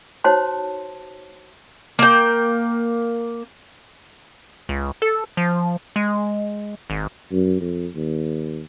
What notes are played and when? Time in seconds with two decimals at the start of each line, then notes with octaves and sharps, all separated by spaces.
0.24 D#4 F#4 C5 C#5 A5 C6
1.99 A#3 G5
4.69 C#2
5.02 A4
5.37 F3
5.96 G#3
6.90 G#1
7.32 F#2
7.61 F2
7.95 D#2